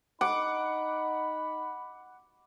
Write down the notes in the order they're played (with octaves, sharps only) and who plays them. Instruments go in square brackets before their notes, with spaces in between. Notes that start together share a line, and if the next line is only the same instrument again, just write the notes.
[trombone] D#4 [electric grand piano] F#5 [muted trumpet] B5 [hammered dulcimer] D6